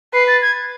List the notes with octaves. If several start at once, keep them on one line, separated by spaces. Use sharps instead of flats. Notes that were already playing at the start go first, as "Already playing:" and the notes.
B4 C7
A6
G#6